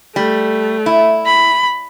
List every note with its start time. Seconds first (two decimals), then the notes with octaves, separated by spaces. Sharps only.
0.16 G3 A3
0.86 E4
1.26 B5